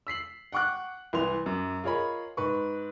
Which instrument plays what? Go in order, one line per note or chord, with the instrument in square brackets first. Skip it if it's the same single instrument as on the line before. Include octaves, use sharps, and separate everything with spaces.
[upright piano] E6 B6 C7 F#7
F#5 G5 C#6 D6 F#6
C2 E3 B4 C6 F7
F#2
F4 G#4 A#4 C#5 D#5 B5
G#2 B4 C#6